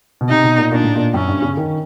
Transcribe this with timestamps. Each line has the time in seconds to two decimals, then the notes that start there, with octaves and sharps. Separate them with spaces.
0.21 B2
0.30 C3 D#4
0.44 B2
0.58 A#2
0.72 A#2 D4
0.83 A2
0.96 A#2
1.14 F#2 C#4
1.28 G2
1.42 C#3
1.57 D#3